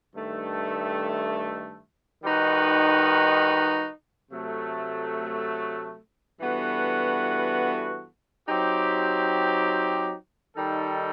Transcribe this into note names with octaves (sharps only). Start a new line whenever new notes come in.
G2 D#3 A3
D#3 G3 D#4 F#4 B4
C3 F#3 A3
G2 E3 B3 F#4 A4
F#3 C4 D#4 G4
D#3 G3 D#4 A4